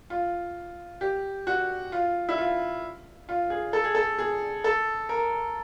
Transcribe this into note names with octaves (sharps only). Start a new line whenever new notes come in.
F4
G4
F#4
F4
E4
F4
F4
G#4
A4
G#4
A4
G#4
A4
A#4